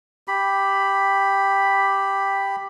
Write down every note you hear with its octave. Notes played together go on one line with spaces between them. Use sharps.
G4 B5